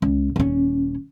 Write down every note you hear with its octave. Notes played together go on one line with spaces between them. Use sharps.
C#2
D#1 C#4